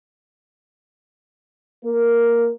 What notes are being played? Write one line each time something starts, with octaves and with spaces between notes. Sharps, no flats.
A#3 A#4